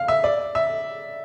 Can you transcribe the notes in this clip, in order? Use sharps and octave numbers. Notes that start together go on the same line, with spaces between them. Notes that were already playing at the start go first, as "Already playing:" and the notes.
Already playing: F5
E5
D5
E5